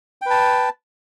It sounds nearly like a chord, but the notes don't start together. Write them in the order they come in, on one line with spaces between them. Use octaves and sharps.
G5 B4 A5